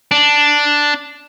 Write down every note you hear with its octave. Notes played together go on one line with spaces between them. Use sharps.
D4